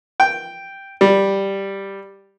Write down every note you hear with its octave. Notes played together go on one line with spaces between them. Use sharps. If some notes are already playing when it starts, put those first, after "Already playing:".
G5
G3